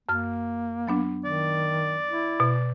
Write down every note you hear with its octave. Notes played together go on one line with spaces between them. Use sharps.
F#2 A#3 F6
F#3 B3 D4
D#3 D5
E4
B2